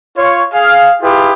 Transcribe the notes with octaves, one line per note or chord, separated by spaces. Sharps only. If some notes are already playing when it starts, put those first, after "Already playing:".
F4 C#5
G#4 F5
E4 F4 G4 G#4 B4